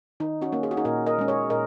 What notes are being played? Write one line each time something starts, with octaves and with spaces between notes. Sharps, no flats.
D#3 D#4
C#4 F#4
A#3 C#4
G#4
F#4
D#4 G#4
A#2 F#4 A#4
A#4 D#5
G#3 C#4
G#4 C#5
A#2 A#4 D#5